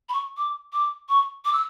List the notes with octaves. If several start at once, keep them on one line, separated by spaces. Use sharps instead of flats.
B5
C#6
D6
D6
C#6
D6
E6